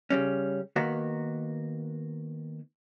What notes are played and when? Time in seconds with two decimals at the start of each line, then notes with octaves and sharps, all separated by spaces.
0.10 C#3 G3 C#4
0.76 D#3 A#3 B3 F#4